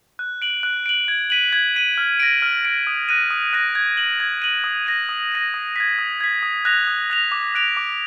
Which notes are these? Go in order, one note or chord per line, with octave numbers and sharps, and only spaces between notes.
F#6
D7 F#7
F#6
D7 F#7
G#6
B6 D#7 F#7
G#6
B6 D#7 F#7
F6
A#6 D7
F6
A#6 D7
D#6
F#6 A#6 D#7
D#6
F#6 A#6 D#7
G#6
D#7 F#7
G#6
D#7 F#7
D#6
A#6 D#7
D#6
A#6 D#7
D#6
G#6 B6
D#6
G#6 B6
D#6
F#6 A#6 F7
D#6
F#6 A#6 F7
D6
F#6 D7 F7
D6